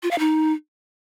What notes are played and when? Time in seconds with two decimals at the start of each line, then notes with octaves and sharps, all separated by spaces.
0.03 F4
0.11 F5
0.19 D#4